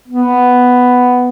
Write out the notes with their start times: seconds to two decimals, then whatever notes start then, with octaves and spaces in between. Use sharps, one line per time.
0.08 B3